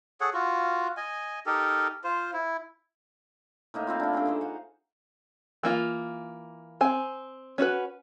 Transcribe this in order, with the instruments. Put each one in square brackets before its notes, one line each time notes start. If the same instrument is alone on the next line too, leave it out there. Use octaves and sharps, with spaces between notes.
[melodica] G#4 A4 C#5 F#5
F4 F#4
D#5 G#5
D#4 G4 A4 A#4
F4 C5
E4
[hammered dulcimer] A2 A#3 D#4 E5
C4 E4 F4
A#3 D4
C#4 D4 G4 A4
D#4 G#4 C5
F5 F#5
[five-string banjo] E3 A#3 F4
C4 G#5
C#4 D4 F#4 B4